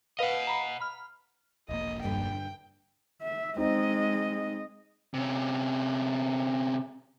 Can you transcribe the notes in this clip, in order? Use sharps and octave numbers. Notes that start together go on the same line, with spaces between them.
B4 D#5 F5 F#5
A#5 B5
B5 F6
E1 A#1 A#3 D#5
G2 D3 B4 G5
E5
G#3 C4 D#4 D#5
C3 C#4